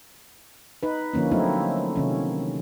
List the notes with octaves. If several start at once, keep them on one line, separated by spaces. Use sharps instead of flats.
D#4 B4
D3 F3 A#3 C#4
F#3 A3 C4 D#4 E4
C3 D#3 C#4